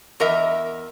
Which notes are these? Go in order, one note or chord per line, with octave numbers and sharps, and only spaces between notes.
E2 A#4 D#5 E5